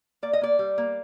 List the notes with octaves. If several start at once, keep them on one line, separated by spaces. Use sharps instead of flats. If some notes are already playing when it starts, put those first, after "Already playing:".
A#3 D5
D#5
A#3 D5
G3
A#3